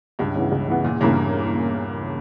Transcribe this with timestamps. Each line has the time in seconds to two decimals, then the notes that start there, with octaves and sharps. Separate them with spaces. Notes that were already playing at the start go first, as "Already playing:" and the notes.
0.19 C#2 G2
0.36 C#3 E3 B3
0.52 C#2
0.68 C#3 E3 B3
0.84 E2 A#2
1.01 G2 C#3 E3 A#3